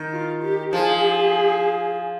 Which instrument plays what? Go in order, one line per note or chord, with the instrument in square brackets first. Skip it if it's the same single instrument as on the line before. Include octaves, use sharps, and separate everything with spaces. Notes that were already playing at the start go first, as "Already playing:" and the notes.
Already playing: [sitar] D#3
[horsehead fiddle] F4
G4
[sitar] F3 [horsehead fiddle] G#4